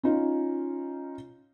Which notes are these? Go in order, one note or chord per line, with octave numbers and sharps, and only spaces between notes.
C#4 D#4 F4